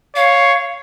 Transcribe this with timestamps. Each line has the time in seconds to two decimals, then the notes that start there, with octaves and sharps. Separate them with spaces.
0.16 C#5 F5